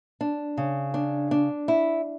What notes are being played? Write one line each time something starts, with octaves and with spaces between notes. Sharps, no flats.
D4
C#3
D4
D4
E4